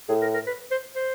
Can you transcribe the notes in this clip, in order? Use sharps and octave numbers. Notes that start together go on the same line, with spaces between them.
A2 G#4
A#4
A#4
B4
C5
C5